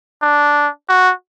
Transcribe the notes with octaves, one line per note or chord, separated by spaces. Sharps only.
D4
F#4